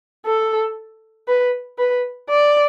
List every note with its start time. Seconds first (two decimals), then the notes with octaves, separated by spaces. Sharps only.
0.26 A4
1.28 B4
1.78 B4
2.29 D5